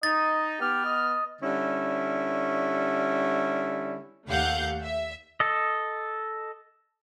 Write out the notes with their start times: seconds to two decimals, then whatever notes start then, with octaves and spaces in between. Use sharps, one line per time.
0.03 D#4 D#5 A6
0.60 B3 G4 F6
0.85 D#5
1.41 D3 G3 C#4 E4
4.26 D#2 A3 G4 F5 F#5 G6
4.83 E5
5.40 A4 D#5